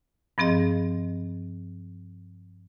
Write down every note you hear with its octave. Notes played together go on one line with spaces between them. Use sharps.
G2 F3 C4 G#4 D#5